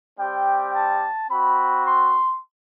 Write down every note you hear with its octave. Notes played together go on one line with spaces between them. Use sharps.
G3 C4 G4 G5
A5
C4 F#4 B5
C6